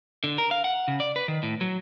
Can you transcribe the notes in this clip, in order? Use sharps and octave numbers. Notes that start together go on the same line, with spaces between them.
D3
A#4
F5
F#5
C#3
D5
B4
D#3
A2
F#3